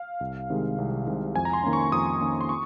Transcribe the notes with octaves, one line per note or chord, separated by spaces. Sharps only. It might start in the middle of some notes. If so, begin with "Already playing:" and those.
Already playing: F5
C2
C3 D#3 G#3
C2
C3 D#3 G#3
F2 G#5
A#5
C6
D#3 A#3 C#4
C#6
F2 D#6
D#3 A#3 C#4
C6
C#6